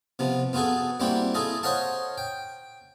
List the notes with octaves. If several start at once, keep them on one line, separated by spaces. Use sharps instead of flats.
C3 F3 B3
B3 F4 F#4 G#4 A4
G3 A#3 C4 E4 F#4 G4
E4 F4 G#4 A4 D#5
C5 C#5 D#5 F5 F#5 A5
G5